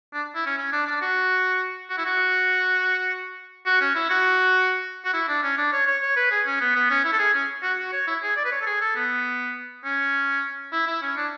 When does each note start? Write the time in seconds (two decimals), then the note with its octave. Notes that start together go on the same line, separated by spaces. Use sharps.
0.13 D4
0.35 E4
0.46 C#4
0.57 C#4
0.72 D4
0.86 D4
1.01 F#4
1.90 F#4
1.98 E4
2.05 F#4
3.66 F#4
3.81 C#4
3.95 E4
4.10 F#4
5.05 F#4
5.14 E4
5.28 D4
5.43 C#4
5.57 D4
5.72 C#5
5.87 C#5
6.02 C#5
6.16 B4
6.31 G#4
6.46 C#4
6.60 B3
6.75 B3
6.90 C#4
7.04 E4
7.12 A4
7.19 G#4
7.34 C#4
7.63 F#4
7.78 F#4
7.93 C#5
8.07 E4
8.22 G#4
8.36 D5
8.45 B4
8.52 C#5
8.61 A4
8.66 G#4
8.81 A4
8.95 B3
9.84 C#4
10.72 E4
10.87 E4
11.02 C#4
11.16 D4